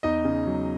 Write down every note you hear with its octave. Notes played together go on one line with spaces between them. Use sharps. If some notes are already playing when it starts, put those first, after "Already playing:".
E2 D#4 D#5
C#3
F#3